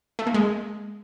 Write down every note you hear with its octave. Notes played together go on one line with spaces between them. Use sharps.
A3
A#3
G#3